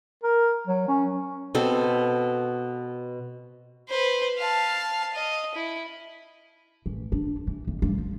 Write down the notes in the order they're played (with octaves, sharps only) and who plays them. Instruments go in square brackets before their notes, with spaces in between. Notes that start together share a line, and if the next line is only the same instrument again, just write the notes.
[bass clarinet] A#4
F#3
C#4
[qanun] B2 C4 A4
[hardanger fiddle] B4 C5
F5 A5
D#5
E4
[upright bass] A1
D4
E3
G#1
G2
F3